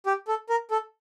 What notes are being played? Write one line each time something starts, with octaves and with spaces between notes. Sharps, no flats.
G4
A4
A#4
A4